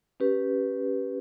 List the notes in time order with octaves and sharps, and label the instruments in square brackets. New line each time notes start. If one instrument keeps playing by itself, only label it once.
[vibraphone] C#4 G4 B4